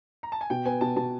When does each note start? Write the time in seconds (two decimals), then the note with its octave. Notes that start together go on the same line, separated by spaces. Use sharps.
0.23 A#5
0.32 A5
0.41 G#5
0.50 B2 G5
0.65 B3 G#5
0.81 B2 A5
0.96 B2 A5